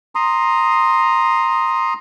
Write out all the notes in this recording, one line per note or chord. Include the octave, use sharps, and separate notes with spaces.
A#5 C6 D#6